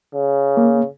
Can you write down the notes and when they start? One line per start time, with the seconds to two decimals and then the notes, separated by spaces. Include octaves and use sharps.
0.14 C#3
0.57 A#3